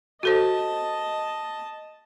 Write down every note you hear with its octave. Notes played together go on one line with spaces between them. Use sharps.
F#4 A4 C5 D#5 A5